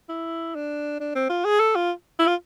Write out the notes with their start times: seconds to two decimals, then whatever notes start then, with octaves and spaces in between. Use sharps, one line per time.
0.09 E4
0.55 D4
1.00 D4
1.15 C4
1.29 F4
1.45 G#4
1.59 A4
1.75 F4
2.19 E4
2.27 F4